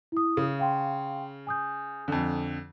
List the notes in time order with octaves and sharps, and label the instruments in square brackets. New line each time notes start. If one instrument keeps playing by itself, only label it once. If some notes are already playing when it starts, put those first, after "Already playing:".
[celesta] E4 D#6
[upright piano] C#3
[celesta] F5 G5 C6
G#5 D#6 G6
[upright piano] F2 D3